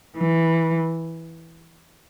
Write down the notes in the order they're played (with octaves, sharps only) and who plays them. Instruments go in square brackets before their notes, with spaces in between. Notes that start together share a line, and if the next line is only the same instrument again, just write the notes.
[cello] E3